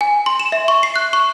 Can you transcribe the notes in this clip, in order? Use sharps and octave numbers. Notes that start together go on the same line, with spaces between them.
G#5
C6
E7
E5
C#6
C7
F#6
C#6